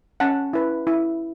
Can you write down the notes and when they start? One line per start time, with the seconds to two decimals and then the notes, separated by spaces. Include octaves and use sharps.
0.20 C#4 F#5 A5
0.53 E4 B4
0.87 E4